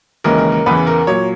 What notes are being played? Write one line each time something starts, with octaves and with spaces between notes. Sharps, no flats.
D#2 C#3 E3 G#3 A#4
A#4
A#4
E2 C#3 E3 B4
A#4
A#2 F#3 C#5